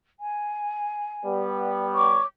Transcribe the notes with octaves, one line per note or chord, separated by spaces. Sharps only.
G#5
G3 B3
C#5 C#6 D6